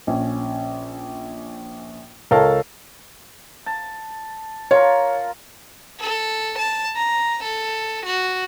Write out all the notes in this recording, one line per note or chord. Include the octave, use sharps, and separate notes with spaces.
A#1 C#4
C#2 A4 A#4 C#5 F5 A5
A5
F4 A#4 C#5
A4
A5
A#5
A4
F#4